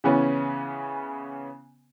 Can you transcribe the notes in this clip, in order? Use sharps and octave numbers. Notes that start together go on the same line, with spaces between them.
C#3 E3 B3 C#4